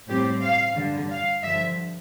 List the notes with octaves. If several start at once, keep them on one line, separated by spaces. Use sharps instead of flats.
A2 G3 C4 G4
F5
G2 D3 G3 D4
F5
G2 D3 F3 E5